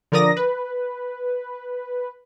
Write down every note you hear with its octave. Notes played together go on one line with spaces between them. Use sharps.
D3 F3 A#4 D5 D#6 A#6
B4